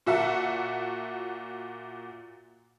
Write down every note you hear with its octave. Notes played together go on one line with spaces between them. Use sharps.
A#2 F#4 E5 F#5 A5